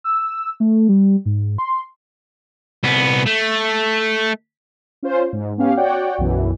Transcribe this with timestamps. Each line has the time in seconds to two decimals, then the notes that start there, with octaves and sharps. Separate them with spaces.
0.04 E6
0.60 A3
0.89 G3
1.26 G#2
1.58 C6
2.84 C2 B3
3.27 A3
5.03 C#4 F4 C5
5.33 G#2
5.58 B3 C#4 G4 F5
5.77 F#4 C#5 D5 F#5 G5
6.18 B1 F#2 B2 E3